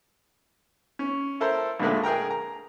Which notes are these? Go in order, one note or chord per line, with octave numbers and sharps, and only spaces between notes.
C#4
E4 A4 A#4 C5
A#1 A#2 D3 G#3 A3
G#4 A#4 G5 A#5
A#5